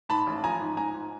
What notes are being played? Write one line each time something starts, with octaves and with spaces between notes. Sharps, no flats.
G#2 A5 B5
A1
F3 G#5 A#5
G#2
G#2 G#5 A#5
G#2